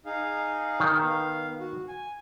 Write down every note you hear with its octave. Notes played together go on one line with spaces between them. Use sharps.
D#4 G#4 F5
D#3
B3 F5
F#4
G#5